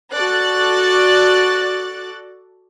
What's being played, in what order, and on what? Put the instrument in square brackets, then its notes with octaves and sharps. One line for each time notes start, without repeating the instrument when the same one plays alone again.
[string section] F#4 A4 D5 F#6 A6